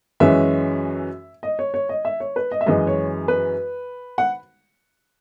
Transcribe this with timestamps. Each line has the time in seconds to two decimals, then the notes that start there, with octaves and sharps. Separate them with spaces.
0.20 F#2 E3 G#3 C#4 E5
1.43 D#5
1.59 C#5
1.74 C#5
1.89 D#5
2.05 E5
2.20 C#5
2.36 B4
2.52 D#5
2.61 E5
2.66 F#2 E3 G#3 D#5
2.87 C#5
3.28 B4
4.18 F#5